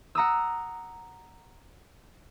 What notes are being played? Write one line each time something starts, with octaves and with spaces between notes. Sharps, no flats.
F#5 A#5 D#6 E6